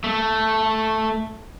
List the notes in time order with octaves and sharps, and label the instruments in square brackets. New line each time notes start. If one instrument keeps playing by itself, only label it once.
[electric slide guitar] A3